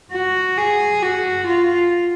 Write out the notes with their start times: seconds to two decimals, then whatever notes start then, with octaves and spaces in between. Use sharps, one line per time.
0.12 F#4
0.57 G#4
1.03 F#4
1.48 F4